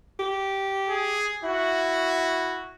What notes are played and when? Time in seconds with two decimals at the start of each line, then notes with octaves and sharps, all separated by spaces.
0.19 G4
0.89 G#4
1.43 E4 F#4